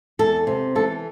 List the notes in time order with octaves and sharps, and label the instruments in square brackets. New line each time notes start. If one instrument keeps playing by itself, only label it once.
[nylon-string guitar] E2 A4
C3
E3 A4